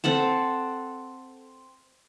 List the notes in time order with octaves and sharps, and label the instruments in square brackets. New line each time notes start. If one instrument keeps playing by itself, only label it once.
[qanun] C4 A4 F#5 A5